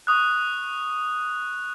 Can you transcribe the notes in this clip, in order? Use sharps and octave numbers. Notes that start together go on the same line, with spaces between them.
C#6 D#6 F#6